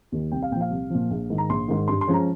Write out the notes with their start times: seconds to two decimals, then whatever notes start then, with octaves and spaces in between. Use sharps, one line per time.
0.12 D#2 D#3
0.32 C2 G5
0.42 F5
0.51 A#2 G5
0.56 F3
0.61 F5
0.71 C2
0.90 A#2 F3
1.11 A#1
1.30 G#2 D#3
1.38 A#5
1.49 A#1 C6
1.68 G#2 D#3
1.88 G2 C6
2.01 C6
2.07 F3 G#3 C#4
2.14 A#5